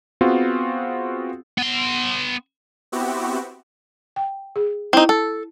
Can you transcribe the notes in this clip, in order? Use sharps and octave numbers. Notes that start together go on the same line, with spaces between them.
B3 C4 F4 F#4 G#4
B3 C6
B3 C4 E4 F#4 G4
G5
G#4
C4 D#4 E4
A4